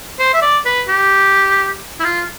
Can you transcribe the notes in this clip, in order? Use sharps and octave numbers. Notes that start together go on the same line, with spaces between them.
C5
E5
D5
B4
G4
E4
F4